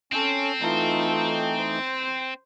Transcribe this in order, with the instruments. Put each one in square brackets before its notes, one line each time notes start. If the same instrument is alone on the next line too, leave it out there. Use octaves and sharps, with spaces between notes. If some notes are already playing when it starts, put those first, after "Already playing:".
[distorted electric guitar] C4 [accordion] C#4 [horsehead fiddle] A4
[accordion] E3 A3 D#4 [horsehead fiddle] F4 A4
[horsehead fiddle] C5